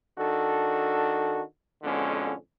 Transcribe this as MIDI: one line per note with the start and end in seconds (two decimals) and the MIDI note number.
0.17 1.41 51
0.17 1.41 62
0.17 1.41 66
0.17 1.41 69
1.83 2.33 41
1.83 2.33 44
1.83 2.33 47
1.83 2.33 50
1.83 2.33 56
1.83 2.33 61